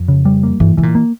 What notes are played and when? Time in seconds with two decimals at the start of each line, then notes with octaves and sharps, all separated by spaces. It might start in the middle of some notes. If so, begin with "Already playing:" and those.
Already playing: F2
0.08 C#3
0.25 G3
0.43 A#3
0.60 G2 E3
0.77 C#3 E3
0.83 A#2
0.95 A#3